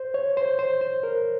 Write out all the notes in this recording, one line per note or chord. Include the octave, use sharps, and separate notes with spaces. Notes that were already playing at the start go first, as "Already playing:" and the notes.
Already playing: C5
C#5
C5
C5
C5
A#4